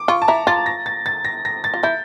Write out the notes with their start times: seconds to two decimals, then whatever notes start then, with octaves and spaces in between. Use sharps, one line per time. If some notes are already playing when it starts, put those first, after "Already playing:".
Already playing: D6
0.08 F4 C#6
0.22 A5
0.28 E4 A#5
0.47 F4 A6
0.66 A#6
0.86 A6
1.06 A6
1.25 A#6
1.45 A#6
1.64 A6
1.74 F4
1.83 E4 G6